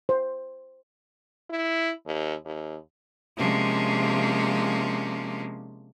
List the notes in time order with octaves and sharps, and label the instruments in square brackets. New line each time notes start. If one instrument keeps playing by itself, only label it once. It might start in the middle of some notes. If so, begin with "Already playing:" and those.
[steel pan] C5
[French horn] E4
D#2
D#2
[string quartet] C3 F3 G#3 A#3 C#4 D4